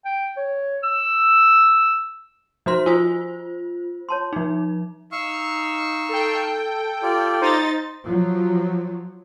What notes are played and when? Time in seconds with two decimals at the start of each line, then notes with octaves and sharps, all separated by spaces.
0.05 G5
0.37 C#5
0.83 E6
2.66 F3 F#4 C5 A#5 C6
2.86 F4 C5 G#5 D#6
4.09 C#5 A5 C6
4.33 F3 D4 D#4
5.12 D#4 F5 C#6 E6
6.09 A4 G5
7.03 F4 G4 D5
7.41 D#4 C5 A6
8.03 F3 F#3